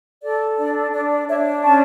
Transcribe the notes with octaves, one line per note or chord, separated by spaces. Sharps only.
A4 D5
D4 D5
D4 D5
D5
D4 C#5 E5
C#4 A5 C#6